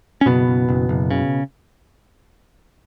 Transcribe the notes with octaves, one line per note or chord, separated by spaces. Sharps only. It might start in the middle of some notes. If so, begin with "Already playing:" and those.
C#4
F#1 B2 B3
F#1
F#1
F#1
C#3